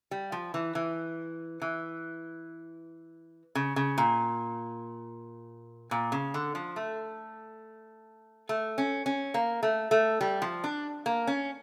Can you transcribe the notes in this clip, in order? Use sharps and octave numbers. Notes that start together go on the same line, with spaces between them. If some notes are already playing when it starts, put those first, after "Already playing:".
G3
F3
E3
E3
E3
C#3
C#3
A#2
A#2
C#3
D3
F3
A3
A3
C#4
C#4
A#3
A3
A3
G3
F3
D4
A#3
C#4